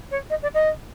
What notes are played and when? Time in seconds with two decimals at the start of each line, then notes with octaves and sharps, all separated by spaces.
0.11 C#5
0.30 D#5
0.42 D5
0.54 D#5